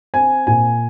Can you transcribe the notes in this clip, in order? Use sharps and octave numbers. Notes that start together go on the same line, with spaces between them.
C4 G#5
A#2 G#5